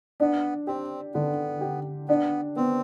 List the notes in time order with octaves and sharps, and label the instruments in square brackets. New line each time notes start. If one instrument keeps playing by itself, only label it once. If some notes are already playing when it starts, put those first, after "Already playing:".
[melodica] B3 [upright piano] D4
[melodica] C4 [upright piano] G4
[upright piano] D3 [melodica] B3
[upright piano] G4
[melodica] B3 [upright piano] D4
[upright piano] B3 [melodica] C4